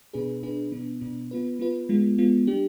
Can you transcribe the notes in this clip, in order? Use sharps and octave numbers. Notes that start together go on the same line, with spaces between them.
B2 B3 D4 G#4 B4
B2 B3 D4 G#4 B4
B2 B3 D4
B2 B3 D4
B3 F4 B4
B3 F4 B4
G#3 B3 F4
G#3 B3 F4
G3 D4 G4